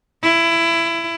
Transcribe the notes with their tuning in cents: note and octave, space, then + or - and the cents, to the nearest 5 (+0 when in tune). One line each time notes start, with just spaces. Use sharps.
E4 +20